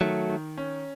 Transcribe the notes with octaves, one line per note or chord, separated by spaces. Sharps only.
D#3 F#3 A3
D#3
C#4